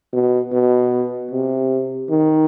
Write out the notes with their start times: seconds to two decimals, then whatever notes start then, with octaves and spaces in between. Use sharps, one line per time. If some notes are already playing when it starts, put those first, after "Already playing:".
0.13 B2
0.52 B2
1.31 C3
2.10 D#3